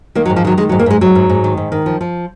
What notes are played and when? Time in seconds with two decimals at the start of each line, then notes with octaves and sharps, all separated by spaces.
0.15 D#3 A#3
0.26 F#3
0.30 G#2
0.36 F3
0.45 D#3 F#3
0.57 D#3 G#3
0.69 G#2 F#3
0.79 A#3
0.86 G#2 G#3
1.01 G#2 F#3
1.15 G#2
1.29 G#2
1.44 D#3
1.57 G#2
1.72 D#3
1.86 F3
2.01 F3